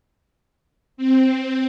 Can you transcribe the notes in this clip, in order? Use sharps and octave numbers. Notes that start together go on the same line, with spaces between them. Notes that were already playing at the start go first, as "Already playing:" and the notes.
C4